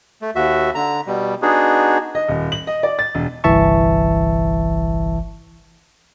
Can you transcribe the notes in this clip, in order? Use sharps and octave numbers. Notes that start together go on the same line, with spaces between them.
A3
D#2 F#4 E5
D3 A#5
B2 G3
B3 D4 D#4 F#4 G#4
D#5
D#1
F#7
D#5
D5
A6
E1
G1 C2 E3 E5 A5 C#6